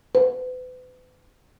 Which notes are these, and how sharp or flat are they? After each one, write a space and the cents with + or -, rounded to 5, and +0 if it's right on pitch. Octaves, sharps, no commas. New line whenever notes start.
B4 +40